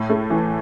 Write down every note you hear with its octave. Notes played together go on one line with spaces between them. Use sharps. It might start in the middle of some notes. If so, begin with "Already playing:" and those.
Already playing: A2
A3
E3